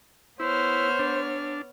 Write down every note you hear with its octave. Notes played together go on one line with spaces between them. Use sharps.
B3 E4 C5 C#5 F6
D4